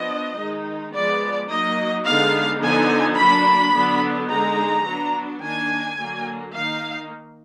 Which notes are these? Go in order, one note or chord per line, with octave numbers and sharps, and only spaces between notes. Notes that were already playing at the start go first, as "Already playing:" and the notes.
Already playing: F3 B3 D4 D#5
D#3 G#3 D#4
F3 G#3 B3 D5
F#3 A#3 D#4 D#5
D3 G#3 B3 D#4 F5
D3 F3 B3 D#4 G#5
F#3 A#3 D4 B5
D3 F#3 B3 D4
D3 G#3 D#4 A#5
F#3 B3 D4
D#3 A#3 D4 G#5
D3 F#3 A#3
D#3 A#3 D#4 F5